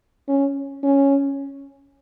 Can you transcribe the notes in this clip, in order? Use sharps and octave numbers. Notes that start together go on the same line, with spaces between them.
C#4
C#4